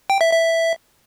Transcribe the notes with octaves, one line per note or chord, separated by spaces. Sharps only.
G5
E5
E5